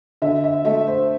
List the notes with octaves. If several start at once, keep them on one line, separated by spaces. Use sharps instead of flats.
D3 E5
E5
A3 E5
C5